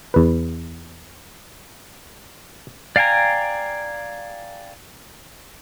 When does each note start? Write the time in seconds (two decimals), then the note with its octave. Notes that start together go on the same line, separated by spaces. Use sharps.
0.14 E2 B4
2.96 D5 F5 G5 G#5 A#5